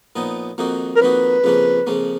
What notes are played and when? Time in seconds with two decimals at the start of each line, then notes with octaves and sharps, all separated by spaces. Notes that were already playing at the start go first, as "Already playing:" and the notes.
0.16 A#2 F3 B3 D#4
0.58 F2 D#3 A#3 D#4 F#4
0.96 A#4
1.00 F2 D#3 A#3 D#4 F#4 B4
1.44 F2 C#3 F3 A#3 C#4
1.87 F2 C#3 F3 A#3 C#4